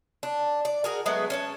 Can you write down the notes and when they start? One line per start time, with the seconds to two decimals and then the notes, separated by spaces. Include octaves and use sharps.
0.23 D4
0.65 D5
0.84 F#4 G#4 A#4
1.06 F#3 G#3 A3 B3
1.30 C#4 C#5 A5